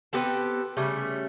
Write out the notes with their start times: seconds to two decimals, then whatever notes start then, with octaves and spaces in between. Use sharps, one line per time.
0.13 B3 C4 G4 A4
0.77 C#3 G3 A3